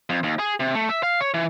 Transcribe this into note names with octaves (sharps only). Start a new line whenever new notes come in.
F2
D#2
G#4
C3
A3
E5
F5
C#5
E3